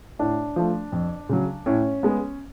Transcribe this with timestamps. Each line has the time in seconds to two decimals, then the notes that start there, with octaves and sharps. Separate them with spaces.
0.19 A2 D4
0.56 F3 A3
0.92 F2
1.29 C#3 F#3
1.66 A2 C#4
2.03 G#3 B3